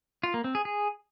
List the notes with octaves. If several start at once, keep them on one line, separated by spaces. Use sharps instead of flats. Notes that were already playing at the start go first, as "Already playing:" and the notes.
F4
A#3
C4
G#4
G#4